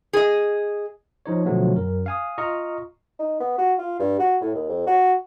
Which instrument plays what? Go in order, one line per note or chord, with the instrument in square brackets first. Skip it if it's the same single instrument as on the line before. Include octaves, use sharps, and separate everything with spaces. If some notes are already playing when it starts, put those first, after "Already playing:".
[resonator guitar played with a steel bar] G#4 D#5
[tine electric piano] F3 D#4 C#5
B2 D3 F3 F#3 A3 B3
F#2 A#4
F5 G#5 D#6
F4 D#5 A#5 C#6 F6
[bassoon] D#4
B3
F#4
F4
G2
F#4
A2
D#2
F2
F#4